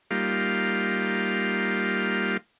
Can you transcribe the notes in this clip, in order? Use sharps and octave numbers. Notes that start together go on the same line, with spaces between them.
G3 A#3 D#4 F4 G4 F5